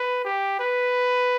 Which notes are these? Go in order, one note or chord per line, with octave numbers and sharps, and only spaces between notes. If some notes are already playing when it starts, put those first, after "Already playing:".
Already playing: B4
G4
B4